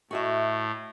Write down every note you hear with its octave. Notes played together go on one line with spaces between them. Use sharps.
A2 F#4 D#5 E5